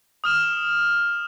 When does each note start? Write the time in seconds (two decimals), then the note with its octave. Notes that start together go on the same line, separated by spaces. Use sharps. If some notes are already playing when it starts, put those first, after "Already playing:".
0.24 D#6 F6 E7